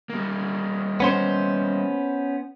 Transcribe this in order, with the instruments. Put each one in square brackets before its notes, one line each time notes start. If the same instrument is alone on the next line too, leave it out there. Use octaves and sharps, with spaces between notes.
[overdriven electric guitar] G3 A#3
[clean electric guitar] B3 C#4 C5